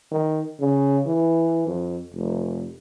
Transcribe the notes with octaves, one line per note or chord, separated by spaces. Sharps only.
D#3
C#3
E3
F2
F1